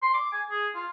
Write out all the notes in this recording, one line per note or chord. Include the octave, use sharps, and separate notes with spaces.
C6
D6
G#5
G#4
F4